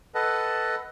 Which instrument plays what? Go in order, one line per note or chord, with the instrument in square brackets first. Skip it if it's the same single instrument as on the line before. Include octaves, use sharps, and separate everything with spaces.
[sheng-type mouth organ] A4 B4 D#5 F#5 A5